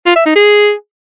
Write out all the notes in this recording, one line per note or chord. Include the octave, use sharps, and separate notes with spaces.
F4
E5
D#4
G#4